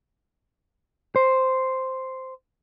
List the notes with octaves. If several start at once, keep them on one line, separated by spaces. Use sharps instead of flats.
C5